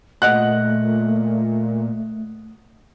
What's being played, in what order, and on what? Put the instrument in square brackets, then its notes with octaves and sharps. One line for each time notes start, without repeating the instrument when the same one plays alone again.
[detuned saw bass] A#2 [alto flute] A3 [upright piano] D#5 F#5 F#6